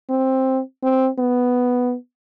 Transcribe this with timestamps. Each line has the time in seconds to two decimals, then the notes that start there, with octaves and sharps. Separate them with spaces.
0.10 C4
0.83 C4
1.19 B3